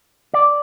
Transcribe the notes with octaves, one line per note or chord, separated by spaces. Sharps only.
D5